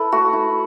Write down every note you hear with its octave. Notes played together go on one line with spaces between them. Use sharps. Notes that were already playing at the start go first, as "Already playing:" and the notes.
Already playing: E4 A4 B4
A3 F#4
E4